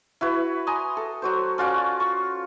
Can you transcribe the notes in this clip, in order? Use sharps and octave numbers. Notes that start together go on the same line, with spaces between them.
E4 F#4 B4
G#5 A#5 C6 D#6
A4
F#3 F#4 C5
C#4 F4 F#4 D5
C#6